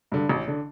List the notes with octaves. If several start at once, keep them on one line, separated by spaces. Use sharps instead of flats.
G2 D3
A1
D3